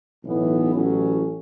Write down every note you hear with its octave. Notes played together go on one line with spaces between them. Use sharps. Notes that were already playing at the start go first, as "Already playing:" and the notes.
B1 A2 E3 B3
A1 A2 F#3 C#4